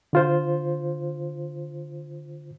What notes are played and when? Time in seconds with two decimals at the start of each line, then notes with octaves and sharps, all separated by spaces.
0.13 D3 F4 C5